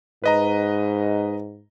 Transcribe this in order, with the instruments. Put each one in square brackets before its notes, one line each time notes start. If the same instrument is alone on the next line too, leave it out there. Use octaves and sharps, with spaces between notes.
[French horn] G#2 [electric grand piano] B4 D#5 A#5